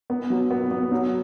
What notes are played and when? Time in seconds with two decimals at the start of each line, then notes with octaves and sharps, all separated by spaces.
0.10 B3
0.30 F#3
0.51 B3
0.71 B3
0.92 F#3